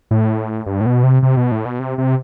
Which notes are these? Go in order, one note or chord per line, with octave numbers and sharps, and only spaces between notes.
A2
G2
A2
B2
C3
C3
B2
A2
B2
C3
C3